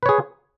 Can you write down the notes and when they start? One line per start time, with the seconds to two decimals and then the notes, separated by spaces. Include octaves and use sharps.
0.03 B4
0.06 C#5
0.09 G#4